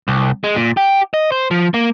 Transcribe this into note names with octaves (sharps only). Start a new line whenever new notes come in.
C2
G#3
A#2
G4
D#5
C5
F3
A#3